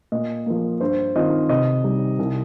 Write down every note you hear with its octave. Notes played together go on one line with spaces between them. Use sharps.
A#2 D#5
F3 A#3
G2 C5
D#3 C4 F4 D#5
C3 D#5
G3 D#4
C2